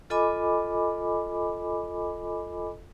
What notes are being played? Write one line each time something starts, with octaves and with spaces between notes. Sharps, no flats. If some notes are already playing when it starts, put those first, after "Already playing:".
F4 A4 D#5 G#5 B5 D6